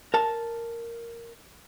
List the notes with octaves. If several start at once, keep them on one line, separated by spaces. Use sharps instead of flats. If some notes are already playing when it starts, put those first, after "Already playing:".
A#4 A5